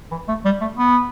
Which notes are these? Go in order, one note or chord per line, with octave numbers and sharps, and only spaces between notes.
E3
A3
G3
A3
B3